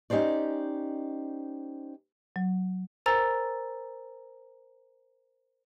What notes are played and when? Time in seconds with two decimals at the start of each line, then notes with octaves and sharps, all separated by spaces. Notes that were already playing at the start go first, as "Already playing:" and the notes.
0.10 C#4 D#4 G4 C5 D5
2.36 F#3
3.06 A#4 C5 G#5 A#5 E6 A6